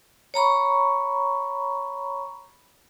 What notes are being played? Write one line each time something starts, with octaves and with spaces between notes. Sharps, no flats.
C#5 A#5 B5 C#6